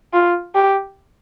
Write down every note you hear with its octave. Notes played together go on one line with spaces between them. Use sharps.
F4
G4